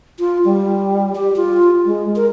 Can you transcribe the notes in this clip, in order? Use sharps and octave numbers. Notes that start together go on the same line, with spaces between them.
F4
G3
G4
F4
G#3
A#4